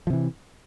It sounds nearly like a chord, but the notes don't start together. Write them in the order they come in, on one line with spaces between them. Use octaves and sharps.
F3 C3 E3